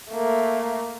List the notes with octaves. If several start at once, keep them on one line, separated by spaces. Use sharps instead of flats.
A3 A#3